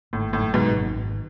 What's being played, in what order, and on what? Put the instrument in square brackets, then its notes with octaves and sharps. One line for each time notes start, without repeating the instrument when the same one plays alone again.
[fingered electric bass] G#1 [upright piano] A2
[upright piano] A2
[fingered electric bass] F#2
[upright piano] G#2 B2
[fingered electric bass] G#1
G#1